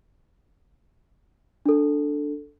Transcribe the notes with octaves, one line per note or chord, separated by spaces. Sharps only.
D4 A4